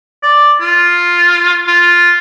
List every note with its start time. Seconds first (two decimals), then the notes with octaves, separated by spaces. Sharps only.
0.23 D5
0.61 F4
1.67 F4